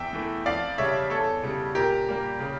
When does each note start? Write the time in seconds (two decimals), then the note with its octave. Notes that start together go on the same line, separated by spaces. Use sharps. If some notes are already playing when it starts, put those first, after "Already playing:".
Already playing: E2 E5 G5
0.13 E3 A3
0.46 F2 D5 F5
0.78 C#3 G3 C#5 E5
1.10 E2 A4 C#5
1.43 C#3 G3
1.75 A#2 G4 A#4
2.08 G3 A#3
2.40 C#3